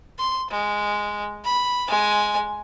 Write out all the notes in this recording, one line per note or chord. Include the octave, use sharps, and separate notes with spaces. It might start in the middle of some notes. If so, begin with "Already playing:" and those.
C6
G#3
B5
G#3 G#5